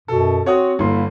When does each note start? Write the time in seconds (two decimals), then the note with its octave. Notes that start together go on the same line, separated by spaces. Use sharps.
0.08 F#2 B2 A4
0.46 C4 F#4 C#5 F#5 D#6
0.79 G1 A#3 E4 C6